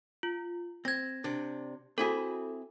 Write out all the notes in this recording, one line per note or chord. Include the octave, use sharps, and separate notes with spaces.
F4
C4 G#6 A#6
C3 D4
C4 E4 F#4 G#4 A4